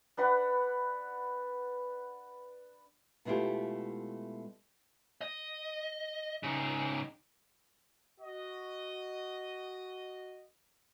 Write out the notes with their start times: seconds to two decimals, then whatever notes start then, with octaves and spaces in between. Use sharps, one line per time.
0.17 D4 B4 F#5 B5
3.25 B2 G#3 A3 E4 F4 G4
5.21 D#5
6.43 C#3 D#4
8.20 F#4 D#5